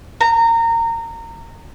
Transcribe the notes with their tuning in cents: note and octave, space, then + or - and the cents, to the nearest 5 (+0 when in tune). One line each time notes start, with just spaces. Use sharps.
A#5 -25